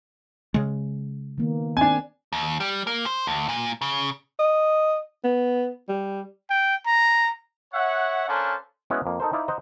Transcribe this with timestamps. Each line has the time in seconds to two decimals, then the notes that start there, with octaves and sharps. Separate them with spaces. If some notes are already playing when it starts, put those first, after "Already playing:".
0.54 C#3 G#3
1.38 D#3 A#3 B3
1.77 C4 D4 G#5
2.33 D#2
2.60 G3
2.87 A#3
3.06 C5
3.27 D2
3.48 A#2
3.81 C#3
4.39 D#5
5.24 B3
5.89 G3
6.50 G5
6.87 A#5
7.74 C#5 E5 F#5
8.29 A#3 C#4 D4 A4 C5
8.90 G#3 B3 C#4 E4 F#4
9.06 F2 A#3
9.20 D#4 A4 A#4 C5
9.33 D#4 E4 C5 D5 F5
9.48 C5 D#5 F#5 A#5